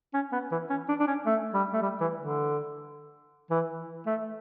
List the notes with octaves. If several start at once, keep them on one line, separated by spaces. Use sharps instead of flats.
C#4
B3
E3
C#4
D4
D4
C#4
A3
G3
A3
G3
E3
D3
E3
A3